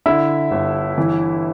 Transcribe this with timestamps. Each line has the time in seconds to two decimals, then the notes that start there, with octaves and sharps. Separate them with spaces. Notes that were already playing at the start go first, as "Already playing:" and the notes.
0.06 D3 E4 E5
0.51 G1
0.98 E3